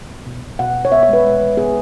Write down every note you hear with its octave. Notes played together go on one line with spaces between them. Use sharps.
B3
B2
B2
B2 F#5
B2
C#5
B3 E5
C#5
G#3 B4
G#3
E3
B3 G#4